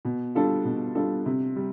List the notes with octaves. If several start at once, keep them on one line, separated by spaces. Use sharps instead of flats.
B2
G3 D4 F4 A4
B2
G3 D4 F4 A4
C3
G3